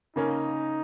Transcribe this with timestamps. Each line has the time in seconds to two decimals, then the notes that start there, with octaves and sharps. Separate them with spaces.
0.16 C#3 A#3 C#4 D#4